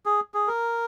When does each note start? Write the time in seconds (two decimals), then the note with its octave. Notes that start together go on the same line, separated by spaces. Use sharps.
0.06 G#4
0.34 G#4
0.47 A#4